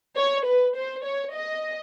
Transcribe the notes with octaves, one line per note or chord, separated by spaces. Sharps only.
C#5
B4
C5
C#5
D#5